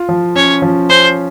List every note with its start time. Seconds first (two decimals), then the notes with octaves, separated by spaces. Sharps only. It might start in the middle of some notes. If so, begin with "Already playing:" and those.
Already playing: F4
0.09 F3
0.35 C#4 C#5
0.62 F3
0.89 C#4 C5